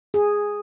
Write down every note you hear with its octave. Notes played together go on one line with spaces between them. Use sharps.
G#4